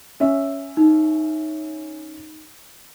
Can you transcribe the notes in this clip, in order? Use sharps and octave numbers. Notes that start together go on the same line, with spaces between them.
C#4 E5
D#4